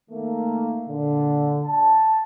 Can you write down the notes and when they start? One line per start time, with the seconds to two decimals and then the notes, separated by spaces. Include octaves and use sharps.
0.10 D#3 A3 A#3
0.87 A#2 D3
1.65 A5